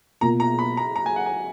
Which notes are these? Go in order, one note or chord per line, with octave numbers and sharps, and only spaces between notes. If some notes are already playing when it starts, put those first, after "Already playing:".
B2 A#3 F4 A#5
A#5
B5
A#5
A#5
G#5
F#5
G#5